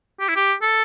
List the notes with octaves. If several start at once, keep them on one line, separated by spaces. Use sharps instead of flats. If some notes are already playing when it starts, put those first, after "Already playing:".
G4
E4
G4
A4